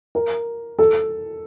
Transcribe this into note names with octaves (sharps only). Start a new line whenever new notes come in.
A#4
A4